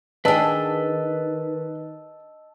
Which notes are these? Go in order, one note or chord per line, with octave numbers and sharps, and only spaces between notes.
D#3 D4 G#4 B4 D#5 G5 A5 E6